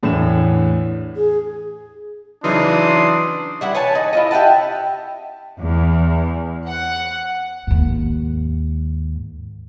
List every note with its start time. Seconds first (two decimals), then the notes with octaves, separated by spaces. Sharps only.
0.03 E2 A2 E3 D4 E7
1.16 G#4
2.44 C#3 E3 F#3 D4 D#4 C6 D#6
3.61 G3 E4 F#5
3.74 B4 C#5 G#5 A5
3.95 D#4
4.13 E4 F4 D#5
4.31 G4 E5 F#5 A5
5.60 E2
6.68 F#5
7.67 D#2 G#2